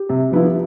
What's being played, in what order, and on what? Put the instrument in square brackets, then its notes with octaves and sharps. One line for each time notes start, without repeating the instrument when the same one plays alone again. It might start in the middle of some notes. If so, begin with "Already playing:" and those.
Already playing: [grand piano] G4
[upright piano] C3
[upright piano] F3 B3 E4 [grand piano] F4
[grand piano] G4